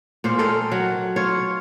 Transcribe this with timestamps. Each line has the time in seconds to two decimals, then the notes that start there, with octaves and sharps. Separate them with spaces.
0.24 A#2 C#4 C5
0.39 A4 A#4 D#5 G5
0.72 F#3
1.16 F4 C#5